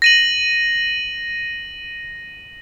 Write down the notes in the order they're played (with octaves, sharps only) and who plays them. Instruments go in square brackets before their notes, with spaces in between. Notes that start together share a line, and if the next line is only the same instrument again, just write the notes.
[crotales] A#6 D#7 F#7